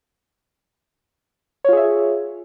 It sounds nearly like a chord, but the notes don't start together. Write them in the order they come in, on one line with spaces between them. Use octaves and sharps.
C#5 F4 G#4 E5